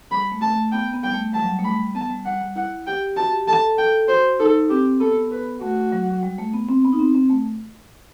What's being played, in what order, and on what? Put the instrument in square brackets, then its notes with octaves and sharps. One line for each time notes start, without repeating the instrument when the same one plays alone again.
[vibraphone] G3 [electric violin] B5
[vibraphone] A3
[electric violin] A5
[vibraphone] A3
[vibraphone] B3 [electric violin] G5
[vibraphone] B3
[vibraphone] G3 [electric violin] G5
[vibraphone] A3
[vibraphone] G3 [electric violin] A5
[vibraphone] F#3
G3
A3
[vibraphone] G3 [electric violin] B5
[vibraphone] B3 [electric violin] A5
[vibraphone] G3
[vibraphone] G3 [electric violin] F#5
[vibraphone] G3
[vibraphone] E4 [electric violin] F#5
[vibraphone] G4 [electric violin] G5
[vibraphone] F#4 [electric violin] A5
[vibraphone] G4
[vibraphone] A4 [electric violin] A5
[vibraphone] A4
[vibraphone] A4 [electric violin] G5
[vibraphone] F#4 [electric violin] C5
[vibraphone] D#4 [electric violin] A4
[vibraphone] C4 [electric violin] G4
[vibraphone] B3 [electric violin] A4
[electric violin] B4
[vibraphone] A3 [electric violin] F#4
[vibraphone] F#3
G3
A3
B3
C4
B3
D#4
C4
C4
A3